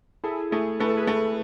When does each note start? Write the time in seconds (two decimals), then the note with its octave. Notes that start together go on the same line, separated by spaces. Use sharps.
0.24 E4 G#4 A4
0.51 A3 E4 G#4
0.80 A3 B4
0.89 A4
0.97 G#4 B4
1.07 A3